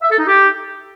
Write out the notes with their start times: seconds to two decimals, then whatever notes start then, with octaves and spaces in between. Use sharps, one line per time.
0.02 E5
0.10 A4
0.19 D#4
0.27 G4